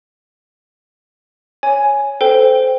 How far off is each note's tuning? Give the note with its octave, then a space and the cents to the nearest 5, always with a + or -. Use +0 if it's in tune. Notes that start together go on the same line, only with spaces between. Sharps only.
C#5 +0 G#5 +0
A4 -5 C5 -20 G5 +0